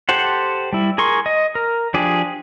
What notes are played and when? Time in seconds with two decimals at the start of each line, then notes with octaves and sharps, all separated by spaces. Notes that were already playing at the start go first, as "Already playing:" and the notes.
0.09 G4 A4 C5 F#5
0.73 G3 E4
0.98 G#4 A#4 C6 C#6
1.26 D#5
1.55 A#4
1.94 F3 D4 G4 G#4